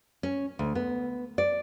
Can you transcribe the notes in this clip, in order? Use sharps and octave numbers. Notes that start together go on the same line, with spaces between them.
C#4
D2
B3
D5